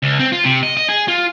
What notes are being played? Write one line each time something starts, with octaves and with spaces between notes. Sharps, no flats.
C#2
C4
F4
C3
D#5
D#5
G#4
F4